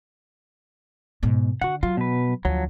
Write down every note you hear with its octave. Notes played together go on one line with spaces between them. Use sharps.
G#2 B2
D3 F#4 F#5
F#3 F4
B2 B4
D2 F3 F#3